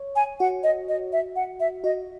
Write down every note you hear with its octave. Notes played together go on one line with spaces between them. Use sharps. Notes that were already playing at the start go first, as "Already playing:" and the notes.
Already playing: C#5
G#5
F#4 F#5
D#5
D#5
E5
F#5
E5
F#4 D#5